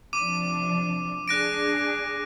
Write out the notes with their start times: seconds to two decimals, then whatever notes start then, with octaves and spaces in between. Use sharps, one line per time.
0.13 C3 F3 D4 D6 D#7
1.28 D4 G#4 F#6 A#6 D7